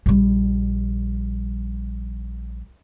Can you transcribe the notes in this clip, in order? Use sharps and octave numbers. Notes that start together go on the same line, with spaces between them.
A#1 G3